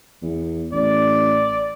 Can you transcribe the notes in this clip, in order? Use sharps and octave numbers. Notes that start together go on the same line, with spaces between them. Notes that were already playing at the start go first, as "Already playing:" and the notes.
E2
A1 D5